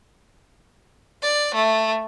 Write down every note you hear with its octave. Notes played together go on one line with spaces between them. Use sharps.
D5
A3